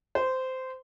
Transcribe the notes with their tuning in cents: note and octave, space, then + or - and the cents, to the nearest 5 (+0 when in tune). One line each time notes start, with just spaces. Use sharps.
C5 -15